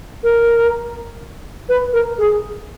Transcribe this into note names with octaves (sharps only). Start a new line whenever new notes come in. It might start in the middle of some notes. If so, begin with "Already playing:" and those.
A#4
B4
A#4
G#4